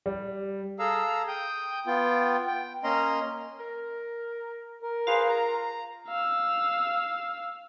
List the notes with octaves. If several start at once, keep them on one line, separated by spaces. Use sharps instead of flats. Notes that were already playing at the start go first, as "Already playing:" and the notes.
G3
G#4 A4 F5 A#5 E6
G5 D#6 G6
B3 F4 G5
G5
A#3 C#4 D#5 A#5 C6
A#4
A#4
F4 G#4 B4 C5 F5
A#5
F5 E6